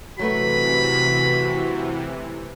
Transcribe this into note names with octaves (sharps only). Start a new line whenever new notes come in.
C3 E3 F#3 A3 F#4 B4 B5